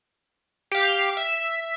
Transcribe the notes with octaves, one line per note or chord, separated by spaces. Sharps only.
G4 F5
E5